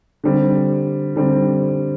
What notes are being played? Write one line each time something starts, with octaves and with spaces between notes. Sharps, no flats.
D3 G3 C4
D3 G3 C4